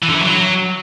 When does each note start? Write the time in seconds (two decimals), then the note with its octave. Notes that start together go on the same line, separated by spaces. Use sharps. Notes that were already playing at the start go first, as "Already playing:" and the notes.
0.03 E3
0.09 D3
0.16 E3
0.22 F#3